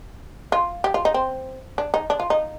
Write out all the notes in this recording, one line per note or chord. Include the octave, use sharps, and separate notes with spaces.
F4
G4
F4
D#4
C4
D4
D#4
D4
F4
D#4